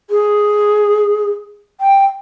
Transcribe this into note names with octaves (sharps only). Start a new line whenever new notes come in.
G#4
G5